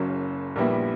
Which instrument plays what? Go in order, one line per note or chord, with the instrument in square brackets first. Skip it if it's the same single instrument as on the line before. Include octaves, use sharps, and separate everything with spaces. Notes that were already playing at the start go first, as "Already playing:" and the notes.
Already playing: [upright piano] F#1 F#2 C#3 F#3
A#1 A#2 G3 B3 E4